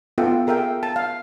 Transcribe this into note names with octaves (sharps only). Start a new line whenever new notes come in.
B3 F4 A4 E5 F#5 G5
G#4 A#4 E5 F5 G5
A5
F5